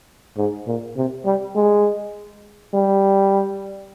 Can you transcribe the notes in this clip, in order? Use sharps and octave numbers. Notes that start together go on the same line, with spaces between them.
G#2
A#2
C3
G3
G#3
G3